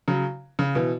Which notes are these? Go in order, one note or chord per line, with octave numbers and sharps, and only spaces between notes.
C#3 F#3
C#3
B2 E3